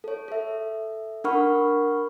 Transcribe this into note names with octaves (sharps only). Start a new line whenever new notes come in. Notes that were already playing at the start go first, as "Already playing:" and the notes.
A4 C#5
A4 E5
D4 A#4 F#5 B5 C#6 F6